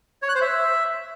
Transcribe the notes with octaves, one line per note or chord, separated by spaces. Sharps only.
C#5
F#6
C5
E5